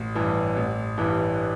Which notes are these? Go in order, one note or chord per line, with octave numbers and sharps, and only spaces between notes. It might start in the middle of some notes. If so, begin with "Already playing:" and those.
Already playing: A1
G2 E3 G3
A1
G2 E3 G3